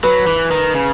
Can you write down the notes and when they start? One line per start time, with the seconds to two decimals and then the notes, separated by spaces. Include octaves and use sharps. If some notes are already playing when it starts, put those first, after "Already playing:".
0.03 F#3 B4
0.27 E3
0.51 D#3
0.75 C#3